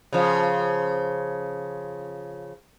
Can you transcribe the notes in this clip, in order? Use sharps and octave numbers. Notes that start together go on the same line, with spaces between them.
C#3 F3